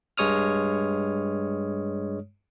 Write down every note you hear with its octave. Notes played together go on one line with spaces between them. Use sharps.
G2 G#3 C#5 D#6 F6